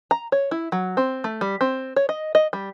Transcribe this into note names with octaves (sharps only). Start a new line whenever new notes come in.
A#5
C#5
E4
F#3
C4
A3
G3
C4
C#5
D#5
D#5
G3